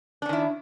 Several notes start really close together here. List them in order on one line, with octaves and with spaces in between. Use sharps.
D4 C#4 D#3 E4